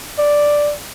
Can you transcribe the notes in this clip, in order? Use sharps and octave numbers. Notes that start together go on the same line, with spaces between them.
D5